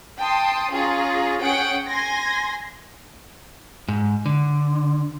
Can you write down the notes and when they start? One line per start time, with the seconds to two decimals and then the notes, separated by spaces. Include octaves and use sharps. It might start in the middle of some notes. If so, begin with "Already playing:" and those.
0.20 G5 A5 C6 D#6
0.71 C#4 F4 G#4 A#5
1.42 C#4 G#4 F#5 G5 D7
1.89 G#5 C6 G#6 A#6
3.88 G#2
4.26 D3